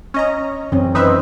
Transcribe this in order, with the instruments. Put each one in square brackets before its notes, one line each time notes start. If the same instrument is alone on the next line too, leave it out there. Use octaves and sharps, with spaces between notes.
[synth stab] C#4 D#5 A#5
[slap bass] F#2 D#3 E3 [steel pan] C4 C#4
[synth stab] D#4 B4 E5 [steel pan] C5